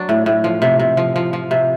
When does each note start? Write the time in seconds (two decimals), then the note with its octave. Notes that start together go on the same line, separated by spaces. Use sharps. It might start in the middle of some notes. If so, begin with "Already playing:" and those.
Already playing: F#3 D4
0.09 A2
0.26 A2
0.44 F3
0.62 C3
0.80 C3
0.97 F3
1.16 F3
1.33 F3
1.51 C3